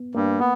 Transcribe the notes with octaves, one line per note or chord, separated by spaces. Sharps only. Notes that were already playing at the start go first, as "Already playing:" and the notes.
Already playing: B3
G2 A#3
B3